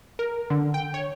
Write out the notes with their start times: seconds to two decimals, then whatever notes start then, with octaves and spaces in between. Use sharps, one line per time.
0.19 A#4
0.50 D3
0.74 G5
0.94 C#5